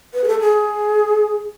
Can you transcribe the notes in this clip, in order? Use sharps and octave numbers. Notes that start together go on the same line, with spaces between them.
B4
G#4
A4
G#4